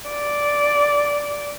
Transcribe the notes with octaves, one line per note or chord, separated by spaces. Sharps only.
D5